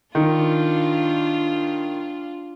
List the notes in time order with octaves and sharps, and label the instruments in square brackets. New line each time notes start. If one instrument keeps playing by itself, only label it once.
[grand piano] D#3 [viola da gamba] D4 F4